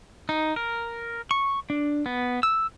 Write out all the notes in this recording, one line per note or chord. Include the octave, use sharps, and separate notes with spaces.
D#4
A#4
C#6
D4
B3
E6